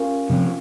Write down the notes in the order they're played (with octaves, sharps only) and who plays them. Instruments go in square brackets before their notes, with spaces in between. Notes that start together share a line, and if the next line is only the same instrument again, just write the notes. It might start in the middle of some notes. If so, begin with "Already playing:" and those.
Already playing: [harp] C#4 F4 G4 A#4
[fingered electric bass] C3 F3 C4